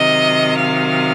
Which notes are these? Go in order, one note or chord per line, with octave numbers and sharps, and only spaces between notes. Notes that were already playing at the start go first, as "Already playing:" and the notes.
Already playing: C3 D#3 F#3 D#5
F5